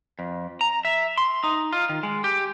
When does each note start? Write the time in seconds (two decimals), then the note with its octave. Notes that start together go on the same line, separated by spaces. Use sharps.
0.19 F2
0.61 A#5
0.85 E5
1.18 C6
1.44 D#4
1.72 F4
1.89 D#3
2.03 G#3
2.24 G4